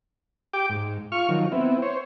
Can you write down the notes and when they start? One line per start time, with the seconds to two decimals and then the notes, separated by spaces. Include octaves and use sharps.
0.53 G4 G5 D6
0.69 G#2
1.12 F4 C#6 F6
1.29 D#3 F3 F#3
1.52 B3 C4 E4
1.82 C5 C#5